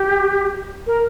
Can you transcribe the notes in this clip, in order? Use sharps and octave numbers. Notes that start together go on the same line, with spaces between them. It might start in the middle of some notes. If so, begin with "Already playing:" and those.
Already playing: G4
A#4